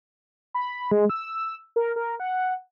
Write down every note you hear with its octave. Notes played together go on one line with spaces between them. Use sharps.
B5
G#3
E6
A#4
A#4
F#5